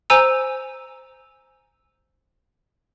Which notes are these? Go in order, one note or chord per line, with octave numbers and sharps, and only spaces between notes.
C5 G#5 A#5 E6